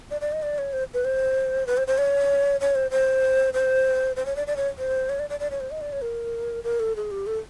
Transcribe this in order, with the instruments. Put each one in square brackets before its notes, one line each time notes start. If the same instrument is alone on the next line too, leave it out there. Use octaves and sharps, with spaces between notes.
[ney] D5
D5
D#5
D5
C#5
C5
B4
C5
B4
C5
C5
C#5
C#5
C5
C5
C5
C5
C#5
D5
D5
C#5
C5
C#5
D5
D5
D5
C#5
C5
D#5
D5
C#5
A#4
A#4
A4
G#4
G4
A4